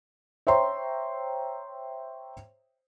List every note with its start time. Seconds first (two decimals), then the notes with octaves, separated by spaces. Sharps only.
0.47 C5 C#5 E5 G5 A#5 C6